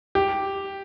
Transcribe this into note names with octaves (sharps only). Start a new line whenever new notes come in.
G4